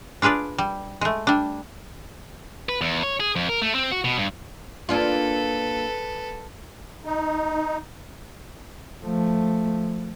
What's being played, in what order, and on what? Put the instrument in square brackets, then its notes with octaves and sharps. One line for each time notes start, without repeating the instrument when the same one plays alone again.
[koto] D4 F4 G#4 B4 D5
G3
G#3 A3
G3 D4
[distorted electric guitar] B4
E2
C#5
G#4
F2
A#4
A3
C4
F#4
B2
G2
[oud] A#3 D4 F4 [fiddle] A4 B4
[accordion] D#4
[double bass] F3 A3